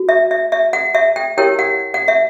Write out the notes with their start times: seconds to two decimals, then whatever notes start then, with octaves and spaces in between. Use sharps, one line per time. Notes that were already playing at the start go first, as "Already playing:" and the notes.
Already playing: F#4
0.09 E5
0.31 E5
0.52 E5
0.73 F#5
0.95 E5
1.16 G5
1.38 E4 G4 A#4 C#5 G5
1.59 F#5
1.94 F#5
2.08 E5